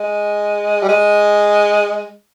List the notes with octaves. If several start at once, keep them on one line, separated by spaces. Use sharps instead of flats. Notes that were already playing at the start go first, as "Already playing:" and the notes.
Already playing: G#3
G3
G#3